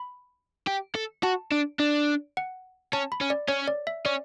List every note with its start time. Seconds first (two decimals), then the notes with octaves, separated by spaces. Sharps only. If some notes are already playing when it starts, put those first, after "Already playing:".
Already playing: B5
0.67 G4
0.95 A4
1.23 F#4 A5
1.52 D4
1.80 D4
2.37 F#5
2.93 C#4 A5
3.12 B5
3.21 C#4
3.30 D5
3.48 C#4 C#5
3.68 D5
3.87 E5
4.05 C#4 D5